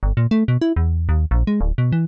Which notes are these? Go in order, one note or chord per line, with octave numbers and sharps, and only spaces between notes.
G1
A#2
A3
B2
E4
E2
D#2
A#1
G#3
D1
B2
E3